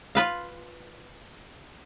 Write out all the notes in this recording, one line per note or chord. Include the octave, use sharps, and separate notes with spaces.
F4 B4 F5